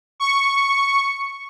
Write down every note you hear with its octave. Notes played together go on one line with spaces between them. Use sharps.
C#6